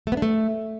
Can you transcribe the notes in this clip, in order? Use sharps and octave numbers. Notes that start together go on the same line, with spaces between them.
A3
B3
D4
A3